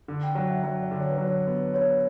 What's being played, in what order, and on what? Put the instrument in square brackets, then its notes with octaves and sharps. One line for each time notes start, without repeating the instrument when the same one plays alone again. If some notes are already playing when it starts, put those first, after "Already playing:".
[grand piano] D3
[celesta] G5
[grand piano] F#3 [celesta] F#5
[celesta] E5
[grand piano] F#3 [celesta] E5
[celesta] D5
[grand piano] D3
[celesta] C#5
B4
[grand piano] F#3
[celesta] C#5
[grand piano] B3
[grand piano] B3 [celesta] C#5